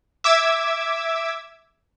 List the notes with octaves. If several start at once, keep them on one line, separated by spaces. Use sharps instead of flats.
E5 D6 E6 G#6